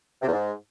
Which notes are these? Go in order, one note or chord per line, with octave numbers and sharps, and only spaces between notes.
C3
E2
G#2